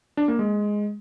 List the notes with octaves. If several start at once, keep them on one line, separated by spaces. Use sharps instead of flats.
D4
A#3
G#3